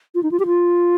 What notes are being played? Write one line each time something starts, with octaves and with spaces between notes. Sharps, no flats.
F4
D#4
F4
G4
F4